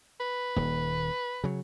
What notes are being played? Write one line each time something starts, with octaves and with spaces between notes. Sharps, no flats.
B4
D#1 D#2
C#3 F#3